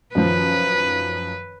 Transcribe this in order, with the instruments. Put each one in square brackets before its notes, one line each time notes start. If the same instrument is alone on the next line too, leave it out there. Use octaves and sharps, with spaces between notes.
[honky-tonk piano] F#2 D#3 F3 [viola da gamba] B4